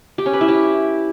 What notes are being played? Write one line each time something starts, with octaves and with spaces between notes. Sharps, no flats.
G4
C#4
B4
E4
G4